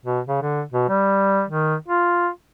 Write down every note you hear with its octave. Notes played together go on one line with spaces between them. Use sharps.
B2
C#3
D3
B2
G3
D#3
F4